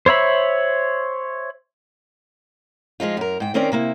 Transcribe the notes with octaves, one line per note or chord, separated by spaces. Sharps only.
C5 C#5 E5 B5
F3 G#3 D#4 F4
F#2 A#4
G#2 G5
D#3 C4 C#4 A#4 C5 D5
C3 A#3 E4